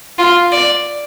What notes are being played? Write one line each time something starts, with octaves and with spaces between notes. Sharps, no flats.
F4
D5